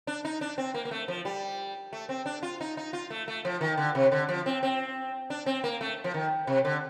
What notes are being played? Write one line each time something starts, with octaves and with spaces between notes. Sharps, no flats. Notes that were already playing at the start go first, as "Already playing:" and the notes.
D4
D#4
D4
C4
A#3
A#3
A3
F3
G3
A3
C4
D4
F4
D#4
D#4
F4
A3
A3
F3
D#3
D3
C3
D3
F3
C4
C4
D4
C4
A#3
A3
F3
D#3
C3
D3